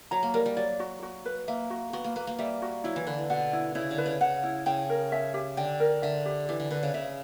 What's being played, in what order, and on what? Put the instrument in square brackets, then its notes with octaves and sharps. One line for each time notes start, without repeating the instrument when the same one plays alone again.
[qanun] F#3 [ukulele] A#5
[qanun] A#3
[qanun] G3 [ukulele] A#4
[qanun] G3
[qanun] F#3 [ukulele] D5
[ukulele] F#4
F#4
B4
[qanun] A#3 [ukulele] E5
[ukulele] F#4
[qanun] B3 [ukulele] F#4
[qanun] A#3
[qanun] A#3 [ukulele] B4
[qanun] A#3
[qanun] G3 [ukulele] E5
[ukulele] F#4
[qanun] F#3 [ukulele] E4
[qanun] E3
[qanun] D3 [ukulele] B4
[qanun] B2 [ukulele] F#5
[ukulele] E4
[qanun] C#3 [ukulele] E4
[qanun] D3
[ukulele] B4
[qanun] C#3
[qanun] C#3 [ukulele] F#5
[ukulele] E4
[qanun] C#3 [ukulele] G5
[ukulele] A#4
E5
G4
[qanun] D3 [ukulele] G5
[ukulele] A#4
[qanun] D3 [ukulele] E5
[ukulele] G4
[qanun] E3 [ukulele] G4
[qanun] D3
[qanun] D3 [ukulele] B4
[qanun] C#3
[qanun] C#3 [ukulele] E5